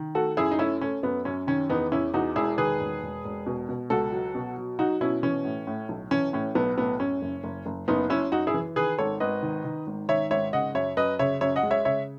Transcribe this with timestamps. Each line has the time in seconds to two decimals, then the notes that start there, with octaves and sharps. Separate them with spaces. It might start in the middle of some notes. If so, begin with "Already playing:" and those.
Already playing: D#3
0.15 A3 F#4 A4
0.37 F#2 E4 G#4
0.51 D#4
0.59 A3 C#4 E4
0.81 A3 C#4
1.03 F#2 B3
1.25 F#2 C#4
1.47 D#3 C#4
1.70 E2 B3 D#4
1.92 E2 C#4 E4
2.14 E2 D#4 F#4
2.35 E1 E4 G#4
2.58 D#3 G#4 B4
2.80 E1
3.02 E1
3.24 E1
3.46 B2
3.69 B2
3.90 C#2 F#4 A4
4.12 F#3
4.35 B2
4.57 F#3
4.79 F#3 D#4 F#4
5.01 B2 C#4 E4
5.23 E3 C#4
5.45 A2
5.67 A2
5.89 B1
6.11 E3 C#4
6.33 A2 C#4
6.55 B1 B3
6.77 A2 B3
7.00 F#2 C#4
7.22 F#1
7.44 F#1
7.66 F#1
7.88 F#1 B3 D#4
8.10 F#2 C#4 E4
8.32 F#2 D#4 F#4
8.47 E4 G#4
8.54 E3
8.76 D#3 G#4 B4
8.98 G#1 A4 C#5
9.20 G#1 B4 D#5
9.43 D#3
9.65 D#3
9.87 G#1
10.09 D#3 C#5 E5
10.30 G#1 C#5 E5
10.53 C#3 D#5 F#5
10.75 F#2 C#5 E5
10.97 F#2 B4 D#5
11.19 C#3 C#5 E5
11.41 F#2 C#5 E5
11.56 D#5 F#5
11.63 G#3
11.71 C#5 E5
11.85 C#3 C#5 E5